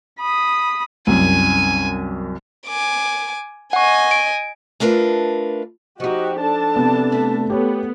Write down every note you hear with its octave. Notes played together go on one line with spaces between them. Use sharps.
B5 D#6
C2 F#2 G#5
G#5 D6
D#5 F#5 G#5 C#6
D7
A3 D4 F4 A#4 B4
F3 D#4 F#4 G4 D#5
D4 A4 A5
C3 B3
A3
B3 G4 C#5